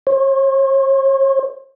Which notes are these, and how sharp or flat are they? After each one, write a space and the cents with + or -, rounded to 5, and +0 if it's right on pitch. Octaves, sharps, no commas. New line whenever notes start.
C#5 -45